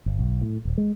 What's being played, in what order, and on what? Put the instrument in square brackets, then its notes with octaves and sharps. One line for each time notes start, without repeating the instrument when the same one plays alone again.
[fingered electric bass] G1
B1
A2
D#1
G#3